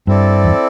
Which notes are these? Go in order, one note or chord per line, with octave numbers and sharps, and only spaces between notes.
G2 C4 E4 A4 D5
E2